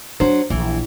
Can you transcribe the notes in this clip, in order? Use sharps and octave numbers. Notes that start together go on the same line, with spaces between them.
F#3 D4 C5
A#1 E3